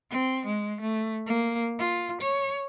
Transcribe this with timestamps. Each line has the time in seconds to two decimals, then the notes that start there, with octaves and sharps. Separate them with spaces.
0.11 C4
0.46 G#3
0.81 A3
1.26 A#3
1.79 F4
2.22 C#5